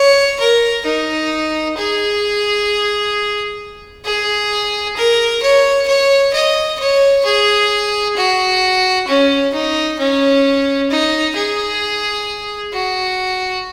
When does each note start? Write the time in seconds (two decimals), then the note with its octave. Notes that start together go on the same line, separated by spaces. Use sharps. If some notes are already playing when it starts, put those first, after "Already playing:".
Already playing: C#5
0.40 A#4
0.85 D#4
1.77 G#4
4.05 G#4
4.96 A#4
5.42 C#5
5.88 C#5
6.34 D#5
6.79 C#5
7.25 G#4
8.16 F#4
9.08 C#4
9.53 D#4
9.99 C#4
10.90 D#4
11.36 G#4
12.73 F#4